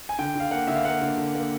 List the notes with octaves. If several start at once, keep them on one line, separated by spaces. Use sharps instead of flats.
G#5
D3 G5
D3 F5
A#3 F#5
D3 E5
F5
A#3 F#5
D3
D3
A#3